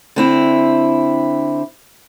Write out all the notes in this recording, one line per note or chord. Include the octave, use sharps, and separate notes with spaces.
D3 C4 E4